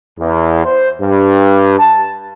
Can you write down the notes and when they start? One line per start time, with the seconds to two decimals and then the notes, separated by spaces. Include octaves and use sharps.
0.19 E2
0.65 C5
1.02 G2
1.79 A5